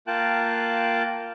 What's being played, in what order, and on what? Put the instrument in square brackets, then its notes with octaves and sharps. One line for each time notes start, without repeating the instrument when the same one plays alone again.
[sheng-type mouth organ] A#3 F4 G5 A5 F#6